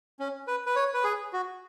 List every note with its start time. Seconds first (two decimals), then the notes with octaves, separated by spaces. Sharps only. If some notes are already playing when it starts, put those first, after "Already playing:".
0.20 C#4
0.47 B4
0.66 B4
0.76 C#5
0.94 B4
1.04 G#4
1.33 F#4